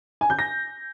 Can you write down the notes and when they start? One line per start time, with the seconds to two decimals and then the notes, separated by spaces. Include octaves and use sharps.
0.21 G#5
0.30 G6
0.39 A#6